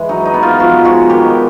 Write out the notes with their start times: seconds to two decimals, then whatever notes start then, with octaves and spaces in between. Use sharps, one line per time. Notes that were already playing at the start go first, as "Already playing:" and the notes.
Already playing: E3 G#3
0.09 F#3 D#4
0.25 D#4
0.34 B3
0.43 F4
0.60 F3 F#4
0.84 G#3 F#4
1.10 D#3 G4